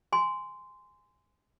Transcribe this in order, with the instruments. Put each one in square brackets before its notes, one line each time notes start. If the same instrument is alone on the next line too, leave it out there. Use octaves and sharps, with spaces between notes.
[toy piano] G#5 C6